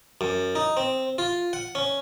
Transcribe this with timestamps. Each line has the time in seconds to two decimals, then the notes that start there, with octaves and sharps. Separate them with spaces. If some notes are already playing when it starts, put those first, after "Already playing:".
0.21 F#2
0.55 D#4
0.77 C4
1.18 F4
1.53 F#5
1.75 C#4